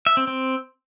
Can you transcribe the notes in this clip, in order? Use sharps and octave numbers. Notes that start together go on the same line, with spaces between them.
E5
C4
C4